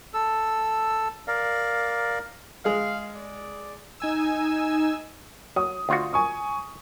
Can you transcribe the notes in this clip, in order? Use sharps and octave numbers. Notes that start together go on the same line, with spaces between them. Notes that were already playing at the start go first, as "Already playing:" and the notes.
A4 E6
A#4 D5 F5
G#3 G#4 F5
D5
D#4 G#5 E6
F#3 D#6
D2 F4 F#4
G#5 C#6 D#6